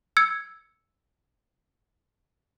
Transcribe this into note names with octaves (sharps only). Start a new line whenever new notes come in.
E6 G#6 C#7